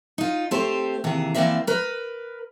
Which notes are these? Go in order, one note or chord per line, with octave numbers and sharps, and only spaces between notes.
D#4 F4
A3 C4 G4 C5
D#2 C3 E3 G#4
E3 G#3 A#3 C4 D5 E5
A#4 B4